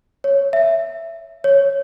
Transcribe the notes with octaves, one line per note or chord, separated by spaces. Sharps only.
C#5
E5
C#5